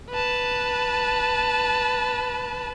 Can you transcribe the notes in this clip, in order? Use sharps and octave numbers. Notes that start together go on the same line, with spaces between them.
B4 A5